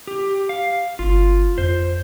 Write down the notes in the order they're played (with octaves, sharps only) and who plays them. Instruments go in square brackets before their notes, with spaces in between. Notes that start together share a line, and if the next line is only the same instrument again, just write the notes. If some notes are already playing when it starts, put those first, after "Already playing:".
[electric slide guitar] G4
F5
[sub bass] G1 [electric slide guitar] F4
[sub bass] F2 [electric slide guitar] C5